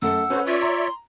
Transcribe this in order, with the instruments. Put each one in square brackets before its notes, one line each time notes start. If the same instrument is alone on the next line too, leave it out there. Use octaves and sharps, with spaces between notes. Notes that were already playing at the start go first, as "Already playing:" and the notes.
[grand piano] F#2 A3 A4 [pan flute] F#5 [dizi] E6
[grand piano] C#4 B4 [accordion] F#4 A4 C5
[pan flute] F4 [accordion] C#5 D5 E5
[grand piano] A#5 [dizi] C6